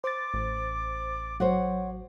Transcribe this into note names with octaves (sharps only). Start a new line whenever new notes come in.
C5 D6 A6
A1
F#3 C5 C#5 F#5